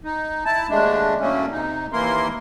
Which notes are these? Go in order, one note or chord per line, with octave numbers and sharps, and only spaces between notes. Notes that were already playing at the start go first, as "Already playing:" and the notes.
D#4
E4 A5
D#2 G#3 A3 D4
A2 D3 F#3 A3 A#3 C#4
C3 D#4
D#2 E3 A#3 E4 A#4 C6